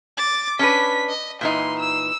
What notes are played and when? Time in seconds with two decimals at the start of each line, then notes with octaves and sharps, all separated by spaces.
0.17 D6 A6
0.59 C#4 D4 B4 B6
1.09 D#5
1.41 A#2 E3 D#4 C6
1.79 E6